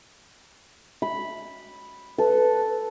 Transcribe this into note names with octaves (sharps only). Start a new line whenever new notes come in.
B5
A4 B4